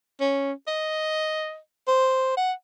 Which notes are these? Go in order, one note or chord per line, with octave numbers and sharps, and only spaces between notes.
C#4
D#5
C5
F#5